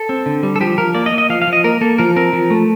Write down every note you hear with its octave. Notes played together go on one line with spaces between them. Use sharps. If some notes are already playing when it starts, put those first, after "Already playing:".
Already playing: A4
C4
D3
G3
A4
F3 G4
F3 A#4
A#3 D5
D#5
A#3
D#5
F3 F5
F5
F3
D#5
A#3 A#4
A#3 A4
F3 A#4
C4 A#4
F3
A3